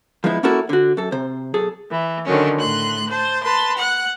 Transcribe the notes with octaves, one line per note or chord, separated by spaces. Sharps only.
F3 G#3 B3 D#4 E4
A#3 C#4 E4 F#4 A4 A#4
D3 F#4
F#2 A4
C3 C5
B1 G#4 A4
E3
D3 D#3 F#3 C#4
A2 C6 F#6
C5 A5
B4 A5 C6
F#5 F#6